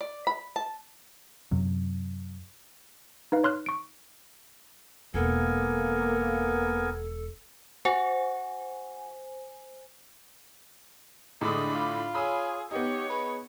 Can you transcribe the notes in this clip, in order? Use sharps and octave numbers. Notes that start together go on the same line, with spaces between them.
D5
B5
A5
F#2 C3 F#3
D#4 B4 F5
C#5 C6 F6 F#6
C#6 D7
E1 A#3 B3 A4 A#4 G#5
F#4 C5 G#5
A2 D3 G#3 D4 B5 D6 D#6
F4
G#4 C#5 B5 D#6 E6
B3 D#4 G4 C#5
G#4 B4